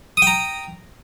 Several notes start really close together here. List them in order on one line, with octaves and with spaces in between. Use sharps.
D#6 G5 A#5